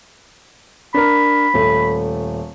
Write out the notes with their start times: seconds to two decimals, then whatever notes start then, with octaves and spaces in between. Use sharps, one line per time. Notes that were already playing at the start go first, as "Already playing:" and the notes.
0.94 D4 A#4 B5
1.54 D#1 A3